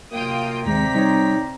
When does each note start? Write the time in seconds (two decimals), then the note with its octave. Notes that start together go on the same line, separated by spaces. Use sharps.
0.12 F#2 C3 A#3 F4 G5 D#6
0.66 D#2 C3 G#3 D5 G5 A#5 B6
0.95 G3 D#4 C#5